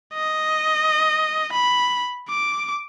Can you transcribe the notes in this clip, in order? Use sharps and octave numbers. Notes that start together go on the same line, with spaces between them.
D#5
B5
D6